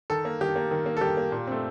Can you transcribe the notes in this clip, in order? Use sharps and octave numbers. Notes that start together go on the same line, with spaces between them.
D#3 A4
A#3
D#3 G4
A#3
D#3
A#3
A4
D#3 G4
A#3
A#2
A3 C4